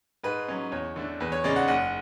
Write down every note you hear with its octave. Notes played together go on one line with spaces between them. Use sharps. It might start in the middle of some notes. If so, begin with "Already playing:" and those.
G#2 B4
F#3 C#4
E2 C#5
D3 A3 D4
E2 B4
C#5
C#3 G#3 C#4 D5
F#5
F#1 F#5